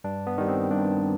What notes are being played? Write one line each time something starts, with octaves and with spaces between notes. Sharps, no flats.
G2 D4
B3
D#3 G3
C4
G2 D4